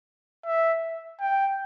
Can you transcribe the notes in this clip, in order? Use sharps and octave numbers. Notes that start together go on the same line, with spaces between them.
E5
G5